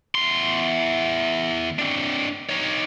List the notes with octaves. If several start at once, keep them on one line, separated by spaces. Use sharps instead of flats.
E2 C6
C4 D4
D#4 C#5